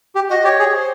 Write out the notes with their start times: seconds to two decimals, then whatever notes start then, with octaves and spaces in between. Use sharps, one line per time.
0.15 G4
0.30 F#4 D#5
0.44 G4 C#5
0.59 G#4
0.74 C5